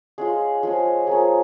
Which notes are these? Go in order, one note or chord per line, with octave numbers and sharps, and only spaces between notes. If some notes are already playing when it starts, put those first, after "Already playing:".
G#3 C#4 F4 G#4
F3 G#3 C#4 G#4
F3 A#3 C#4 G#4